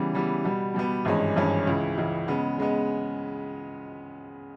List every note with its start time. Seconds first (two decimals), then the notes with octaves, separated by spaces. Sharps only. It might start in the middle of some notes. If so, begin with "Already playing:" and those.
Already playing: C#3 E3 G3 B3
0.13 C#3 E3 G3 B3
0.44 B2 G3 B3
0.74 B2 G3 B3
1.05 G#1 G2 E3 G#3 C#4
1.36 G#1 G2 E3 G#3 C#4
1.66 C#2 C#3 E3
1.97 C#2 C#3 E3
2.28 C#3 G#3 B3
2.58 C#3 G#3 B3